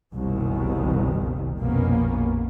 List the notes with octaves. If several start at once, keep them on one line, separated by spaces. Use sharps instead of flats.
F#1 C2 B2 D#3
A#1 F2 B2 A#3 B3 C#4